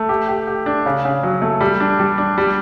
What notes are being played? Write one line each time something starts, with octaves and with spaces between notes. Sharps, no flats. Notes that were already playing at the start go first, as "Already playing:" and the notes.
Already playing: A3
G4
G4
G4
D4
C#3
C#3
F#3
A3
G3
D4
G3
D4
G3